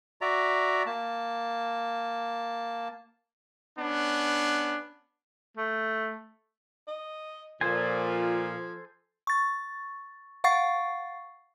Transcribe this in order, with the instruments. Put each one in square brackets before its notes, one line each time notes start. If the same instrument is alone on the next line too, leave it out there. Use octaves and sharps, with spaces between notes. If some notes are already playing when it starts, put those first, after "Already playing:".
[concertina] F#4 D5 E5 A#5
A#3 A5
[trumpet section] B3 C#4 D4
[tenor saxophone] A3
[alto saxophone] D#5
[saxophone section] A#2 [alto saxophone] F3 [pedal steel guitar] A4 C5 G#5
[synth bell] C#6 A6
F5 F#5 C#6 A6 C7